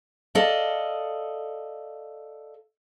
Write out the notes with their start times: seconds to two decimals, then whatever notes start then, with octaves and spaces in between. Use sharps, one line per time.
0.35 A4 D5 D#5 F5